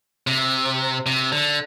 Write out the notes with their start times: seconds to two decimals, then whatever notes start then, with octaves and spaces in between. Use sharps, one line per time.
0.27 C3
1.06 C3
1.32 D3